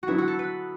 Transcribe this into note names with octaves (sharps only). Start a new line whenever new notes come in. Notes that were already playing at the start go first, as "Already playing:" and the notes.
F#4
D3 F#3 B3 E4
F#4
A4
B4